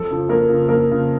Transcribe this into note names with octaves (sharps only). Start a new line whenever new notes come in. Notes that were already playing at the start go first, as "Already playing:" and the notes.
Already playing: F2 A4
C#3 F3
F2 A#3 A#4
C#3 F3
F2 A#3 A#4
C#3 F3